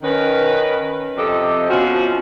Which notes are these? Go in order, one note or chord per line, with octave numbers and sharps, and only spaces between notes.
D#3 C#4 B4
F2 C3 G4 A4 C5 D#5
B2 F3 C#4 F4 F#4